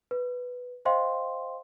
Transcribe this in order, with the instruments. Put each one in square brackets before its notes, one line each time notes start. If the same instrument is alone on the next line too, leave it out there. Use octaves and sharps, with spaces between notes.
[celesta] B4
C5 D#5 F5 G5 C6